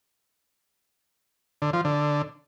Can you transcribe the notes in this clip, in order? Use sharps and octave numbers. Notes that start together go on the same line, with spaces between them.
D3
F3
D3